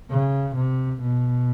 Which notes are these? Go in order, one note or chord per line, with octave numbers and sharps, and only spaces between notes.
C#3
C3
B2